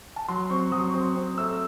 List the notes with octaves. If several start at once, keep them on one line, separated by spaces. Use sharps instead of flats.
A5
F#3 C6
C4 C#6
F#3 D#6
C#6
C4 D#6
C4
A3 E6